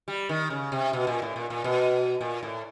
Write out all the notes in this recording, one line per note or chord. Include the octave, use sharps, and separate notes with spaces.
G3
D#3
C#3
C3
B2
A#2
A2
A#2
A#2
B2
A#2
A2